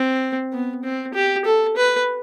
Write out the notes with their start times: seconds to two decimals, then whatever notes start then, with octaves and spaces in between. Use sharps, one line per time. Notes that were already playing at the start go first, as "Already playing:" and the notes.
Already playing: C4
0.52 B3
0.84 C4
1.14 G4
1.45 A4
1.77 B4